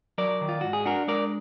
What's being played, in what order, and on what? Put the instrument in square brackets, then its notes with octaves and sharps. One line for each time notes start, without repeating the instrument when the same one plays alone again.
[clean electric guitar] F#3 A#4 D5
D#3
F4
G#2 F#4
G#4
D4 F#4 A#4
G#3 A#4 D5